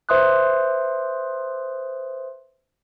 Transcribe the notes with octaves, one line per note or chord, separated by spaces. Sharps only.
B4 C5 E5 C6 D#6 F#6